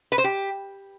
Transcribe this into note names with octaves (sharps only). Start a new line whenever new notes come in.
B4
C5
G4